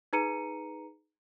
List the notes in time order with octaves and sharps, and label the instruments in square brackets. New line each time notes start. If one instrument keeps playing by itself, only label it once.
[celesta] D#4 G#4 B4 A#5 C#7 D#7